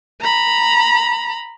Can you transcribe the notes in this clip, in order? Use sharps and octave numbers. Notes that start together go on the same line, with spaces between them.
A#5 B5